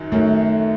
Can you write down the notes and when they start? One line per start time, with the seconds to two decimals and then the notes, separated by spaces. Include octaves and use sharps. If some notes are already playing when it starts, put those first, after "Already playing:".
Already playing: F#2 D#3 F#3
0.12 F#2 D#3 F#3 A3